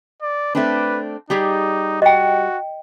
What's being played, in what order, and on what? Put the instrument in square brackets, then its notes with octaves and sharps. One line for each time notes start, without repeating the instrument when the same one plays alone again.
[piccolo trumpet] D5
[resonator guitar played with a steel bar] A3 C4 D4 [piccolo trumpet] B4
[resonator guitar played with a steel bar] G3 G4 G#4 [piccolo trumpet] D#4
[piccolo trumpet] F#4 [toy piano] D#5 G5